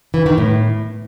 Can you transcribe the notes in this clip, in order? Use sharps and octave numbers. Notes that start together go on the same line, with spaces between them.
E3
D#3
A2